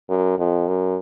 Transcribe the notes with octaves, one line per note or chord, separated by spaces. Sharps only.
F#2
F2
F#2